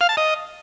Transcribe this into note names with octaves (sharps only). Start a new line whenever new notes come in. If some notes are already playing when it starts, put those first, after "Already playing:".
F5
A5
D#5